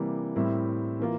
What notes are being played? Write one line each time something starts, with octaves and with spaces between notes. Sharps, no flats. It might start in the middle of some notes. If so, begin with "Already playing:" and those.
Already playing: C3 E3 G3 A#3
A2 G3 C4 E4 A#4
E3 A#3 F4